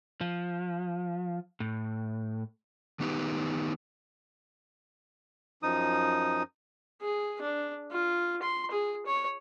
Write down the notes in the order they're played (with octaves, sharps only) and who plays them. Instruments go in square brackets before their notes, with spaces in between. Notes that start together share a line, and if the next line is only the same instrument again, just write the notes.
[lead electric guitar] F3
A2
[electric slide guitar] D#3 B3 D#4 G4 B4
[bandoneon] F#2 F3 D#4 D#6
[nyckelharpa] G#4
D4
F4
C6
G#4
C#5